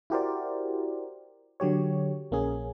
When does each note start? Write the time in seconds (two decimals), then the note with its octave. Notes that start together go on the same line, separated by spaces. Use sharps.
0.10 E4 F#4 G4 A#4 C5 D5
1.60 D3 F#3 G4 C#5
2.31 A#1 A#3 C#4 G#4